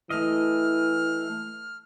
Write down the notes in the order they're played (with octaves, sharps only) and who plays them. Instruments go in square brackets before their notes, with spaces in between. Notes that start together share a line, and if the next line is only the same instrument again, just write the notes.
[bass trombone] E3 [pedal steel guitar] A3 D#5 [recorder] F6